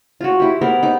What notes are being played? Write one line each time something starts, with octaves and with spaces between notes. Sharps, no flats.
F4 F#4
E4 G4
B3 A#4 C5
D#4 D6